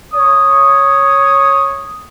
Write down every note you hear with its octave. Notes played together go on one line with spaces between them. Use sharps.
C#5 D#6